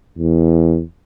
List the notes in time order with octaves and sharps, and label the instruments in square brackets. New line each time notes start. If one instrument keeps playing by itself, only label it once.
[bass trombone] E2